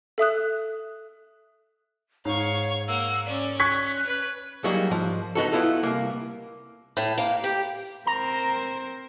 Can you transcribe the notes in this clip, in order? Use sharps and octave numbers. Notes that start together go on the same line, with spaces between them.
A4 E5 D#6 F#6
G#2 C#5 F5 C#6
A#3 F#5 E6
C#4 D5
C#6 F#6 G#6 B6
B4
F#3 G3 A#3 D#4 F#4 G#4
G#2 F3
B3 D#4 F#4 A4
B3 E4 F4 A4
C2 A#3
A2
A#3
G4
C4 A#4 C5 A#5